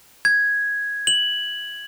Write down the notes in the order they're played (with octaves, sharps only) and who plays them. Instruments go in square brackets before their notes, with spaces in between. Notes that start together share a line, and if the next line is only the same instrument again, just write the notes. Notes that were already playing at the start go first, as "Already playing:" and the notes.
[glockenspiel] G#6
F#7